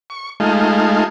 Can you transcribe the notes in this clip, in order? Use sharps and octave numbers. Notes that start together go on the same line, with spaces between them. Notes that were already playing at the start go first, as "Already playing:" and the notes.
C#6
G#3 A3 D#4 F4